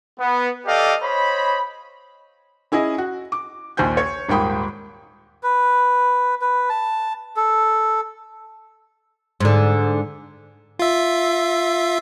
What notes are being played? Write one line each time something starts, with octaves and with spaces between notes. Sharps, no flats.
B3
G4 A4 D5 D#5 F5 G5
C5 C#5 D#5 B5
C#4 E4 G#4 D#5
F#4
D6
A#1 D#2 C5 G#5 G6
C#5
D#1 G#2 A#3 G5 B5 D#6
B4
B4
A5
A4
G#2 D3
F4 E5